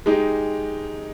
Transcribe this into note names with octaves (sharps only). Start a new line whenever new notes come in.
G#3 D#4 G4